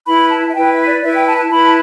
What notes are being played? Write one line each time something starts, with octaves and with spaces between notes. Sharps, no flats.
E4 B4 B5
A5
E5
E4 B4 G5
E5
D5
E4 B4 E5
G5
A5
A5
E4 B4 B5
A5